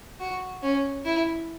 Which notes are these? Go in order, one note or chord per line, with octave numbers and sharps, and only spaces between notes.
F#4
C#4
E4